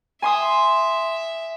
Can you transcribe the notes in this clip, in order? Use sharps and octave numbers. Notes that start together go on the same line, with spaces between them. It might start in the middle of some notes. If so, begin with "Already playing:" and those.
E5 G#5 C6 D#6